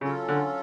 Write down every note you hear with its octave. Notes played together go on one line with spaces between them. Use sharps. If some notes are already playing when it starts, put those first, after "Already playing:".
C#3 F#3 C#4 F4 A4
D3